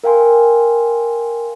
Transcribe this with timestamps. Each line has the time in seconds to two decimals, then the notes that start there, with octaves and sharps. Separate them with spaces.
0.04 A#4 F5 G5 G#5 C6